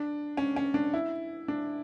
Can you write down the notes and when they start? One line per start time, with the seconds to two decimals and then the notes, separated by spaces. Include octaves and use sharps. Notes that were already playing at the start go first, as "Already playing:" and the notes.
Already playing: D4
0.37 C#4
0.56 C#4
0.74 D4
0.94 E4
1.48 D4